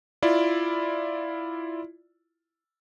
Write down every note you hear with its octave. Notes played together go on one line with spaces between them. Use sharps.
E4 F4 D5